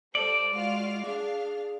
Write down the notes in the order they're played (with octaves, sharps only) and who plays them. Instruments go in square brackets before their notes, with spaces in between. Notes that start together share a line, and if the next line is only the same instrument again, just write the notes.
[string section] G3 A4 C5 [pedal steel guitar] D5
[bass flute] G#3 [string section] F4 F#4 F5
[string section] D4 F5 [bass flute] G#4